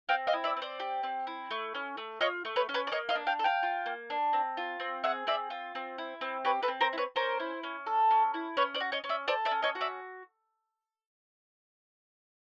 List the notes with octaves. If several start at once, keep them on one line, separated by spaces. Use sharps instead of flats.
C4 F5 G5
D#5 F5
E4
D5 E5
C4
C5 D5
G4
C4
E4
A3
C#4
A3
F4 C#5 D#5
A3
B4 C#5
C#4
B4 C#5
D5
A#3 C#5 D#5
D#5 F5
D4
F5 G5
A4
F5 G5
F4
A#3
D4
C4
F4
C4
G#4 E5 F#5
C4 D5 E5
F4
C4
E4
C4
G4 B4 C#5
A4 B4
C4
A#4 C5
E4
B4 C#5
C#4 A#4 C5
E4
C#4
A4
C#4
E4
C#4 B4 C#5
C5 D5
F#4
C#5 D#5
C#4
D5 E5
A4 C5 D5
D5 E5
C#4
C#5 D#5
F#4
D5 E5